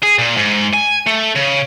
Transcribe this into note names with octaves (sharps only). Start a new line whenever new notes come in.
G#4
A#2
G#2
G#5
A3
C#3